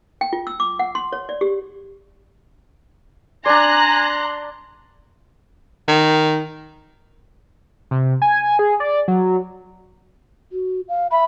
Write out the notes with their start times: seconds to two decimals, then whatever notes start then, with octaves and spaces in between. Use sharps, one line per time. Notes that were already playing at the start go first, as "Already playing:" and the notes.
0.21 G5
0.33 F4
0.47 E6
0.60 D6
0.79 F#5
0.95 C6
1.13 C#5
1.29 D5
1.41 G4
3.46 D4 D5 G#5 A#5 C6 F#6
5.88 D#3
7.91 C3
8.22 G#5
8.59 G#4
8.80 D5
9.08 F#3
10.52 F#4
10.89 F5
11.11 E5 B5